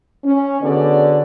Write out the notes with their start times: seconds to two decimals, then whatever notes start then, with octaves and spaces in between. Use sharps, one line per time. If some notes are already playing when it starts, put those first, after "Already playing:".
0.24 C#4
0.61 D3 B3 C#4 F#4 G#4 D5